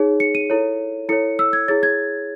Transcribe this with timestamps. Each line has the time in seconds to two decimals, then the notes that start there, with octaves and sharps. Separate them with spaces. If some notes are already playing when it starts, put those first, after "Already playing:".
Already playing: D#4 G#4 C#5
0.20 C#7
0.35 D#7
0.50 E4 A4 C#5
1.09 E4 A4 C#5 C#7
1.39 E6
1.53 G#6
1.68 E4 G#4 C#5 A6
1.83 G#6